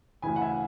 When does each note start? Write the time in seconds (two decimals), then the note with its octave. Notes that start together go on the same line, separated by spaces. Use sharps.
0.22 D2 C#3 E3 G#5 B5
0.36 F#5
0.41 E5 G#5